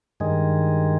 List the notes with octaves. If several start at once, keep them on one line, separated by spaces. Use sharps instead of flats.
G2 D#3 G#3